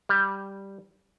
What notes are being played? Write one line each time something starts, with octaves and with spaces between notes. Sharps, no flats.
G3